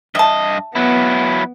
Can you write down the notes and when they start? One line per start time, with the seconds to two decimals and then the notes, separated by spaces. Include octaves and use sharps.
0.15 G2 D#5 E5 A5
0.75 F#3 B3 E4